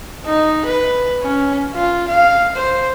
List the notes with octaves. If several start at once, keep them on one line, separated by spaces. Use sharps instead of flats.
D#4
B4
C#4
F4
F5
C5